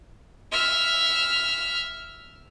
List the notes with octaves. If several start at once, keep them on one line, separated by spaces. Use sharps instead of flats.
E5 F6